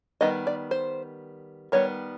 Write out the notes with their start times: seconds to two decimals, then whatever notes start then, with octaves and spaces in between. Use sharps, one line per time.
0.21 D#3 G3 B3 D#5
0.47 D5
0.71 C5
1.72 D#3 G3 B3 C#5